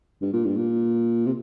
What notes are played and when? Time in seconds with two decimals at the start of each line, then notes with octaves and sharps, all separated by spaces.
0.21 G2
0.33 A#2
0.45 G2
0.56 A#2
1.26 C3